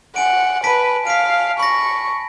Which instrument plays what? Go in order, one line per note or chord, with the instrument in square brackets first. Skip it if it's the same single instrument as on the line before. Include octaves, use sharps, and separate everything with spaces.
[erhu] F#5 [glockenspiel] G#5 D7
[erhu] B4 [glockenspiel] A5 B6 D7
[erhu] F5 [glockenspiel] B6 D7
[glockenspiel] B5 A#6 [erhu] C#6